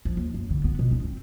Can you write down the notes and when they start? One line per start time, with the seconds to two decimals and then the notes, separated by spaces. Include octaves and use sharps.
0.05 F3
0.17 D#2
0.34 F#2
0.50 D3
0.64 B3
0.79 B2
0.91 C#4
1.04 C4